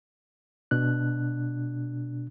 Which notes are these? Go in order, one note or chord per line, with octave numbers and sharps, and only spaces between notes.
B2 D4 F#6